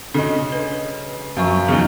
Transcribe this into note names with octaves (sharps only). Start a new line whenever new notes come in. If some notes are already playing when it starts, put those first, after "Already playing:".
C#3 D4 F#4 A4 C#5 D#5
B4
F#2 F3 F4 C5 F5 C#6
E2 C#3 F#3 D#4 G#4